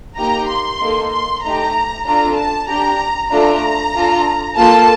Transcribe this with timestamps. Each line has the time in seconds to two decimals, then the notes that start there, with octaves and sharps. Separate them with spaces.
0.17 A#3 D#4 G4 A#5
0.49 C6
0.81 A#3 D#4 A4
1.12 C6
1.43 A3 D#4 G4 A#5
2.06 D4 F4 A4 A#5
2.37 A5
2.69 D4 G4 A#5
3.31 A3 D4 F4 A4 A#5
3.94 D4 F4 A4
4.57 A#3 F4 A4 A5